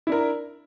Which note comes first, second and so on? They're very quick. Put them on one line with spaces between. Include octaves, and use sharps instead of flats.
E4 D4 A#4